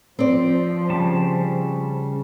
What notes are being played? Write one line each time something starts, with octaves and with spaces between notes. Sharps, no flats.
F3 C4 D5
C#3 G3 A5